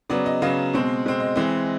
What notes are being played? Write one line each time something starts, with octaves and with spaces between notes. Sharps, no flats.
C#3 F#3 B3 D5
D#5
C#3 F#3 B3 F5
B2 G#3 C4
B2 G#3 C4
D#5
E3 G#3 C4